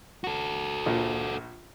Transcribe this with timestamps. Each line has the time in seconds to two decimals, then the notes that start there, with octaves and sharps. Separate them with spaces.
0.24 F#4 A4
0.86 A#1 A#2